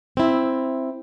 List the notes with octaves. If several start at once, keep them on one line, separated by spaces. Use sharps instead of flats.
C4 E4